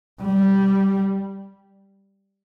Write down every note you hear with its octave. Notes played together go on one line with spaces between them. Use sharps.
G3